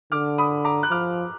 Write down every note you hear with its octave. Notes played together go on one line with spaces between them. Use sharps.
D3 D6 F6
B5 D#6
A#5 D6
F#6
F3 D6 F6